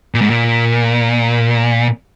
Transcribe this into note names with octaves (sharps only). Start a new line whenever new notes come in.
A#2
G#2
A#2